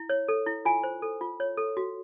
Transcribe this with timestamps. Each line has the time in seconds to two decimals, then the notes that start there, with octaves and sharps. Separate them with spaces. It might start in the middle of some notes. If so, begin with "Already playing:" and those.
Already playing: E4
0.10 C#5
0.28 A4
0.47 E4
0.65 F4 G#5
0.84 C5
1.02 A4
1.21 F4
1.40 C#5
1.57 A4
1.77 F#4